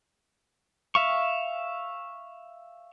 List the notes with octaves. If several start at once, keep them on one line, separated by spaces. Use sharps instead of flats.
E5 F5 C#6